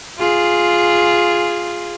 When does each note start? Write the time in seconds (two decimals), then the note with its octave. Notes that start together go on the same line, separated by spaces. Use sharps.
0.18 F4 G#4